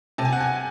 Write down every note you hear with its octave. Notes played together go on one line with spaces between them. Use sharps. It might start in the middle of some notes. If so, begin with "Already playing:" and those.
C3 A5
G#5
F#5
G#5